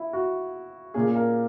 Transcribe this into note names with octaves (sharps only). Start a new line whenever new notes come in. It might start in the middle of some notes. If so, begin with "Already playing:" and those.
Already playing: E4
F#4
A#2 A#3 C#4 G#4
A#4